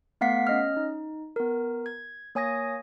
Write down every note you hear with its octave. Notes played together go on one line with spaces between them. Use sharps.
A3 B3 F5 F#5 B6 C7
C#4 D#5 F6
D#4
B3 A#4
G#6
A#3 C#5 G#5 D#6 G#6 A#6